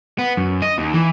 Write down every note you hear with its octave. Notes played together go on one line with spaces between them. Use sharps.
B3
F#2
D#5
D#2
E3